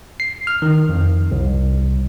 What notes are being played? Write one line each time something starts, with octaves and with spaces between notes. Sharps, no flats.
C7
F6
D#3
F2
C2